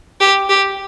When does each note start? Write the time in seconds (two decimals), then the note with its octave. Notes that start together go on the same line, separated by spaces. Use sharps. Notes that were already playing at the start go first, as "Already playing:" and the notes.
0.20 G4
0.49 G4